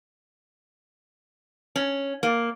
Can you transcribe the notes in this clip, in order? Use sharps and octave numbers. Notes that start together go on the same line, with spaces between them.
C#4
A#3